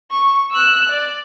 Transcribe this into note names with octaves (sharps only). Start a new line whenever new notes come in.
C#6
E6 F#6
D5